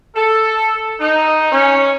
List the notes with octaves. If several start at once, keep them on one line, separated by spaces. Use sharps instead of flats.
A4
D#4
C#4